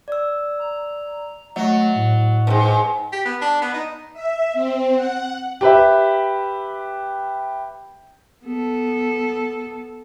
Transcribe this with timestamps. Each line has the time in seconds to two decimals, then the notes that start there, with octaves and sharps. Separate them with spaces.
0.08 D5 E6
0.59 A#5
1.56 F#3 A3 D#5 F#5
1.95 A2
2.47 G#2 C3 B4 G5
3.13 G4
3.25 B3
3.41 D4
3.62 B3
3.74 D#4
4.13 E5
4.53 C4
4.94 F#5
5.61 G4 B4 E5
8.44 B3 A4